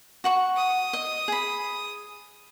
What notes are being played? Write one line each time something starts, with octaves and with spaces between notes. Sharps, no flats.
F#4 F#5 C#6
D#6
D#5
G#4 B5